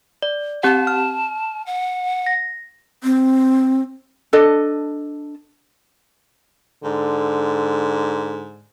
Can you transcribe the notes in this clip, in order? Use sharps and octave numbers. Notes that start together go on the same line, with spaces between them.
D5
C4 G4 F#5 A5
F6
F#5
A#6
C4
D4 A4 D#5
G#2 D3